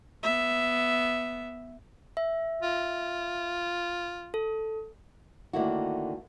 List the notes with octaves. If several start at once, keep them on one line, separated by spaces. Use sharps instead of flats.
B3 E5
E5
F4
A4
D3 D#3 A3 A#3 E4 F#4